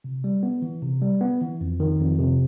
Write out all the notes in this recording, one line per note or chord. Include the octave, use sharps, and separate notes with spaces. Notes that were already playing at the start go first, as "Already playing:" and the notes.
C3
G3
B3
E3
C3
G3
B3
E3
F2
D#3
F2
C3